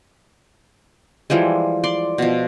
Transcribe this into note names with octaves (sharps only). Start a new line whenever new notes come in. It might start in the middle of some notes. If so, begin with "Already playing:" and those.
E3 F3 G3 G#3
D5 C6
B2 F3